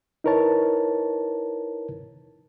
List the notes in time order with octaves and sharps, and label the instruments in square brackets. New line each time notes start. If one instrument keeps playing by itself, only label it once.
[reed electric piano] D#4 E4 A#4 B4 C#5 A5